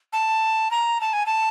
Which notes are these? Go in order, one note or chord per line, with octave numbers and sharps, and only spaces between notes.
A5
A#5
A5
G#5
A5